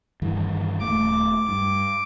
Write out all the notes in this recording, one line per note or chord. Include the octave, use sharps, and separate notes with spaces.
G2 D#3 E3
D#1 A3 D6
G2